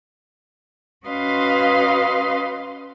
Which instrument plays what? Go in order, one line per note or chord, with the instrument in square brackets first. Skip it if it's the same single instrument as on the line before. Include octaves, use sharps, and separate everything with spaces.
[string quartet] C#4 F#4 B4 D#5 F5 C6